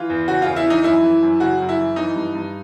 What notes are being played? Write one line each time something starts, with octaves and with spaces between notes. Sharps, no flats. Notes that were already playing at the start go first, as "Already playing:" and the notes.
Already playing: E3 F4
E2
C#3 F#4
E2 F4
E4
E3 D#4
F#2 E4
E3
F#2
C#3 F#4
F#2
E4
E3
E3 D#4
G2
G2